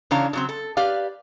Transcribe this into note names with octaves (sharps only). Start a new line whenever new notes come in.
C#3 E3 D4 C#5 F5 A#5
C#3 F#3 C4
A4
G4 B4 D5 F5